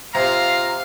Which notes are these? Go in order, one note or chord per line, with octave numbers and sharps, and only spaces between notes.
C3 F4 F5 A#5